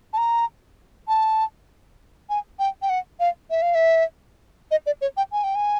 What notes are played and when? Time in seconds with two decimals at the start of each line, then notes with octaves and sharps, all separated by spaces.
0.13 A5
0.18 A#5
1.08 A5
2.29 G#5
2.59 G5
2.82 G5
2.90 F#5
3.20 F5
3.50 E5
3.62 F5
3.75 E5
4.71 D#5
4.86 D5
5.01 C#5
5.17 G5
5.32 G#5
5.44 G5
5.55 G#5